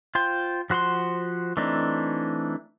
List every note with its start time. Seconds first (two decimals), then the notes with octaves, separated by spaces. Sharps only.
0.15 F4 C5 G5
0.70 F3 F#4 C5 F#5 C6
1.57 E3 A3 C4 D4 D#4